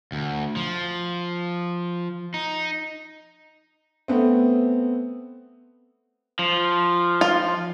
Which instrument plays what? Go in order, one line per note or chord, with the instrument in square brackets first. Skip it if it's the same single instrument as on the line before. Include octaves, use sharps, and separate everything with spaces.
[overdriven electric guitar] D2
F3
D#4
[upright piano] A3 B3 C4
[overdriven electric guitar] F3
[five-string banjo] F4